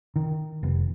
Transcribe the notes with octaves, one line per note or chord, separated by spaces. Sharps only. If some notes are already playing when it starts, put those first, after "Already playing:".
D#3
F1